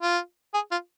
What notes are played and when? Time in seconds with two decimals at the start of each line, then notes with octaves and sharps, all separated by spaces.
0.02 F4
0.54 G#4
0.71 F4